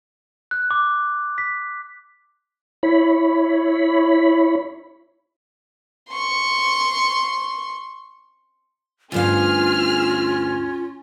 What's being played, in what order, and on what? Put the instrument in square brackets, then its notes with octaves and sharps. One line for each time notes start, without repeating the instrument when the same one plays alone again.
[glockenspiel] F#6
D6
B6
[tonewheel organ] E4 C#5 B5
[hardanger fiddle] C6 C#6
[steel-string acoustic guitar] D2 G2 F5 [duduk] C#4 [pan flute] F4 [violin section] G#4 F6